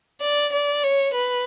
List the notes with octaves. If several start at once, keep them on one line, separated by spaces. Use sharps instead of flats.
D5
D5
C#5
B4